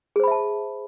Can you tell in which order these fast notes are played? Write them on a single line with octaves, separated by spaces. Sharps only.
G#4 C5 B5 E5 A5